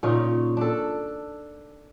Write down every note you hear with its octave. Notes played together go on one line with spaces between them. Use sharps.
A#2 C#3 C#4 D#4
D4 A4